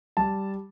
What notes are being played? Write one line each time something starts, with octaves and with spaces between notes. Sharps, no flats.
G3 A5